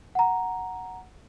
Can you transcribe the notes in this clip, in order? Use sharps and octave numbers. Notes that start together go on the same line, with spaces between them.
F#5 A#5